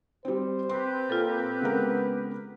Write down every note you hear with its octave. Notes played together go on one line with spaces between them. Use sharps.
G3 C4 C5
C4 G4 B4 C6
A#2 F4 A4
C#3 G#3 B3 A#4